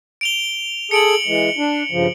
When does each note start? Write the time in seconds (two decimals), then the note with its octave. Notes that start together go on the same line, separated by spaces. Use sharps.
0.21 D7 F7 G7
0.91 G#4 A4 C#7 D7 F#7
1.27 E3 G#3
1.58 D4
1.91 G2 C#3 F3